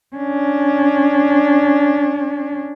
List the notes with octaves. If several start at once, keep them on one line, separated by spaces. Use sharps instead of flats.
C#4 D4